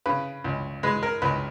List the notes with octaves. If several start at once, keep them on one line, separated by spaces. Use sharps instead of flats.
C#3 B4
C#2
G#3 B4
A#4
C#2 B4